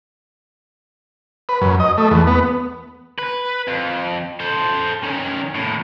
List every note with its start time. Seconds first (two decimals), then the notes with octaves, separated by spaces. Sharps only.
1.49 B4
1.61 F#2
1.80 D#5
1.98 A3
2.11 E2
2.27 B3
3.18 B4
3.67 F2
4.41 A4 C5
5.03 D#3 C#4
5.55 D#2 A2